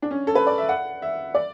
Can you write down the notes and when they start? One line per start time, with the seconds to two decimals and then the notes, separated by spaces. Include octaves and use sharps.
0.02 D4
0.11 C#4
0.27 A4
0.35 B4
0.47 D5
0.58 E5
0.69 F#5
1.02 E5
1.35 D5